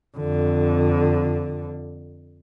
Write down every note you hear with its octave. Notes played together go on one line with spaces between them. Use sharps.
F2 D3